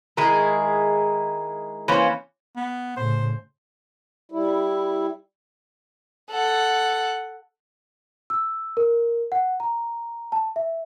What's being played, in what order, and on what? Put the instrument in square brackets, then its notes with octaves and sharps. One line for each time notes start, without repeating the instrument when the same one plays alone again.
[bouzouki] D#3 G#3 E4 G#4
E3 A#3 C#4 C5
[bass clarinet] B3
[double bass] A2 C#3 [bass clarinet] C5
[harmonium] G3 E4
[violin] A4 F#5
[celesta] E6
A#4
F#5
A#5
A5
E5